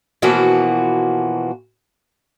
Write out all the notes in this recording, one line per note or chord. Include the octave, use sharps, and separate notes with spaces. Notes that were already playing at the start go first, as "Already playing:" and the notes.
B2 E3 F3 A#3 F#4